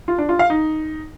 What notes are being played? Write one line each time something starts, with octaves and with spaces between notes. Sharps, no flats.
F4
D4
F4
F5
D#4